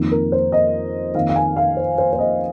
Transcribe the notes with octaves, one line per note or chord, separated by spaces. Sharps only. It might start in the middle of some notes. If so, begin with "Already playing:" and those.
Already playing: F2 D#3 A#3 D#4
A#4
C5
D#5
F2 D#3 A#3 F5
F5
G#5
F5
C5
C5
C5
D#5